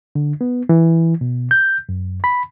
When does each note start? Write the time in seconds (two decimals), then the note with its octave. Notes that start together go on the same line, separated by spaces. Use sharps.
0.15 D3
0.41 B3
0.69 E3
1.21 B2
1.51 G6
1.89 F#2
2.24 B5